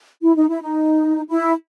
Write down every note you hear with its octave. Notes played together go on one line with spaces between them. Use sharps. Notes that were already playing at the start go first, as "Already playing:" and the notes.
E4
D#4
E4
D#4
E4